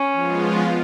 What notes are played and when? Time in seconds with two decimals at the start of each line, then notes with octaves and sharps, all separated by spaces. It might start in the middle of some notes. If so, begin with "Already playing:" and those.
Already playing: C#4
0.13 F3 G#3 B3 F4